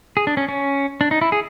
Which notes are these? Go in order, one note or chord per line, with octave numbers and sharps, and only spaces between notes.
G#4
D4
C#4
C#4
D4
D#4
E4
G#4